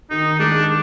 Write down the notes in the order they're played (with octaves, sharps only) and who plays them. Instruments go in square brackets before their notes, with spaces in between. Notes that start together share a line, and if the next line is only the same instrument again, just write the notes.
[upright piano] D#3 [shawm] D#4
[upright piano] G#3 [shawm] D4